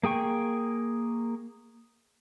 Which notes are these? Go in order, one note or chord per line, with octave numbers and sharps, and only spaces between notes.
A#3 G#4 G5 C#6